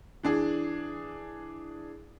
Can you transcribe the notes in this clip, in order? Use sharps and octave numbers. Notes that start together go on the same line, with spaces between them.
E3 D4 G#4